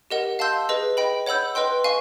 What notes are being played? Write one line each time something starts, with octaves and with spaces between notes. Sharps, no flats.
G4 A#4 D#5 F#5
F5 A5 C6 E6 G6
G#4 B4 D#5
D#5 G5 B5
C#5 F#5 B5 E6 G6
B4 D#5 G5 C6
F5 G#5 C#6